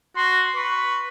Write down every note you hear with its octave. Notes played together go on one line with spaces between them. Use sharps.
F#4 C6
B4 C#6